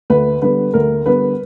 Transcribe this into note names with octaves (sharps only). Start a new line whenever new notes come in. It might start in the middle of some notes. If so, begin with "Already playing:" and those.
D2 B4
D3 G3 B3 B4
D2 A#4
D3 G3 B3 B4